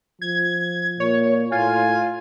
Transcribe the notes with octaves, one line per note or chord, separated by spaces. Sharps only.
F3 G#6
A#2 C#5
A2 F4 G#5